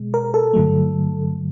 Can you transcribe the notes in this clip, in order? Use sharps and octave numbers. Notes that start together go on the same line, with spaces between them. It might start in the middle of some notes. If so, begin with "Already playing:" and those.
Already playing: B2 G#3
A#4
A4
G2 D3 F#3 A3